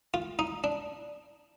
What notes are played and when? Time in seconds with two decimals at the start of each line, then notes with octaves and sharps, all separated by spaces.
0.14 F4
0.39 D#4
0.64 D4